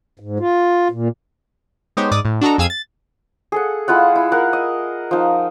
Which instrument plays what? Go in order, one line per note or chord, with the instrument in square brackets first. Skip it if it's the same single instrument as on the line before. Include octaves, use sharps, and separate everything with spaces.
[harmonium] G#2
F4
A#2
[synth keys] G#3 B3 D#4 G4 C5 C#5
G#2 D5 D#6
A2
D4 F#4 A4 D#5 A#5
F2 G#4 F5 E6 G#6 D#7
A6
[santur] G#4 A4 F#5
G#3 E4 F4 F#5
E4
A#4 F#5
D#5
F3 D#4